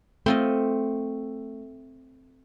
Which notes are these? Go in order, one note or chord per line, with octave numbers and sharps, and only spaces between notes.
A3 C4 F4 D#5